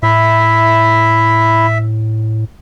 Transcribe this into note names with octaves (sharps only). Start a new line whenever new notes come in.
A2 E4 E5